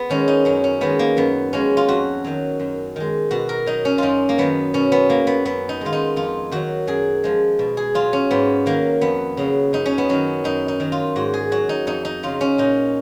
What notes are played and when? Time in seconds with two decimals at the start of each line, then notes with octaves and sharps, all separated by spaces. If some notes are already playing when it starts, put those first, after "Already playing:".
Already playing: B3
0.10 D#3 G#3 C#4
0.28 D#4
0.45 F#2 C#4
0.64 C#4
0.81 D#3 G#3 B3
0.99 A#3
1.17 F#2 B3
1.53 F3 G#3 C#4
1.77 F4
1.88 F2 F#4
2.24 D#3 F#3
2.60 F#2
2.96 D#3 G#3
3.31 B2 F#4
3.49 A#4
3.66 F#3 D#4
3.85 C#4
3.98 F#2 D#4 F4
4.29 A#3
4.38 D#3 F#3 B3
4.74 B2 C#4
4.92 B3
5.09 F#3 A#3
5.27 B3
5.45 F#2 B3
5.69 D#4
5.81 D#3 G#3 F4
5.93 D#4
6.16 F2 F4
6.51 D#3 F#3 F#4
6.87 F#2 G#4
7.24 F3 G#3
7.59 B2
7.77 G#4
7.95 F#3 F4
8.13 C#4
8.31 G#2 B3
8.66 D#3 F#3 A#3
9.01 F2 B3
9.37 C#3 F#3
9.73 F#2 D#4
9.86 C#4
9.98 B3
10.09 D#3 F#3 C#4
10.44 F#2 D#4
10.68 D#4
10.80 D#3 F#3
10.92 F4
11.16 G#2 F#4
11.34 G#4
11.52 F#3 F#4
11.69 D#4
11.87 F2 D#4
12.05 D#4
12.23 C#3 F#3 F4
12.41 C#4
12.58 A#2 D#4